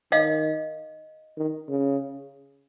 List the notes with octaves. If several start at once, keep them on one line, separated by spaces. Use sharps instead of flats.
D#3 D#5 F5
D#3
C#3